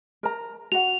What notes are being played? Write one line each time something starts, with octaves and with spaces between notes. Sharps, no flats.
A#4 A#5
F#4 F#5 F7